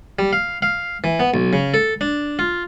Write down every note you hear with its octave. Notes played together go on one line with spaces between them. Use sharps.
G3
F5
F5
E3
B3
B1
C#3
A4
D4
F4